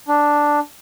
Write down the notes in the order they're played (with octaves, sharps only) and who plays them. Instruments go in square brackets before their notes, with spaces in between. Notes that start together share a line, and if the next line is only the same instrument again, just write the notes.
[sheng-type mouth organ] D4